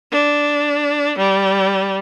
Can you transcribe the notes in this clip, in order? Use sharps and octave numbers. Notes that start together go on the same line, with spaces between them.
D4
G3